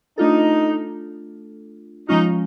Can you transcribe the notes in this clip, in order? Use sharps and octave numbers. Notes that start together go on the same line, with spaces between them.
A3 D4 D#4 F4 A4
F3 G#3 C#4 D#4 F4